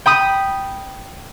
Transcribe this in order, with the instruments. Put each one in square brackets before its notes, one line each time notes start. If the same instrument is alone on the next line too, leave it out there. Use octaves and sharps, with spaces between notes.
[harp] G5 B5 D#6